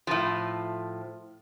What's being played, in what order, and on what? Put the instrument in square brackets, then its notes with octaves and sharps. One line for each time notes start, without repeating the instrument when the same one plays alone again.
[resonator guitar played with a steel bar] A2 F3